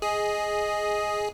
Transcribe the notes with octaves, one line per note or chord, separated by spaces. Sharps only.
G#4 D#5